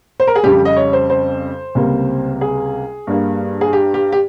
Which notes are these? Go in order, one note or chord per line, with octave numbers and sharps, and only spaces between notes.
C5
A#4
G#4
F2 C#3 G3 G4
D#5
C#5
C5
C5
C#2 C3 G3 A#3
G#4
G2 G3 A#3
G#4
G4
G4
G4